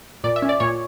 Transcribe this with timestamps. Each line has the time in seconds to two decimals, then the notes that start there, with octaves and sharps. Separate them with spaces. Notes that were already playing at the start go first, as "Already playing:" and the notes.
0.24 A#2 D5
0.36 E5
0.42 C#4
0.49 D5
0.60 A#2 C#5